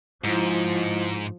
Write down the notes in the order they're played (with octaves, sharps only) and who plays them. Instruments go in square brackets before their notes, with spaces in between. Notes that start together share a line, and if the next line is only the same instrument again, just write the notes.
[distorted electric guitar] G#2 [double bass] F3 [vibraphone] E4